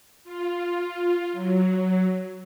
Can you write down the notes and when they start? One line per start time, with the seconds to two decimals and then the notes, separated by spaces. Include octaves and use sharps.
0.24 F4
1.33 F#3